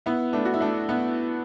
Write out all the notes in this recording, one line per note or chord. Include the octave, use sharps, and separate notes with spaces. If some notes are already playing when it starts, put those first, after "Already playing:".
B3 E4
A3 D4
F#4
E4
A3 D4
B3 E4